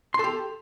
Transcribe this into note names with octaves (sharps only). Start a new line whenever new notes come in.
G4 A4 C6